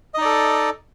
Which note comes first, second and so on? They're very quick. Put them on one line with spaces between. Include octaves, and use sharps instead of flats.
D#5 D#4 D5 A4